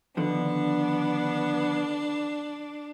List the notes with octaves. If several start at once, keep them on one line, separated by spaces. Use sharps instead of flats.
D3 D#3 F3 B3 D4